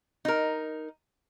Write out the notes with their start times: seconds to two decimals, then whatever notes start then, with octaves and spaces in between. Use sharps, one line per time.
0.25 D#4 A#4